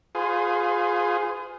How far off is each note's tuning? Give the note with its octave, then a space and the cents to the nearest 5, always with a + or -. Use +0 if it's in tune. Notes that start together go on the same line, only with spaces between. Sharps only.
F4 +20 G#4 +0 C5 -45